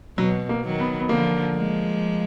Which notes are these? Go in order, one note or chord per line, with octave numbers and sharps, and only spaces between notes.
B2 F#3
A#3
D#3 F#3
B3
B3
D3 F3 A#3
F3 G#3